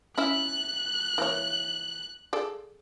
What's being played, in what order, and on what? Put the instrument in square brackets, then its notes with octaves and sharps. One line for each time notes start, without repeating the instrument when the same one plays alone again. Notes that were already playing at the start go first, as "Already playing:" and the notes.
[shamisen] C#4 E4 E5 [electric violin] F#6
[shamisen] E3 A#3 C#5
G#4 A4 D5